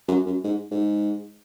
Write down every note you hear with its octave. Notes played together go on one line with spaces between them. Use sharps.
F#2
F#2
G#2
G#2